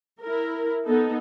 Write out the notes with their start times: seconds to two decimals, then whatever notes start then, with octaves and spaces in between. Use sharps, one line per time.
0.22 E4 A#4
0.86 B3 D#4 A4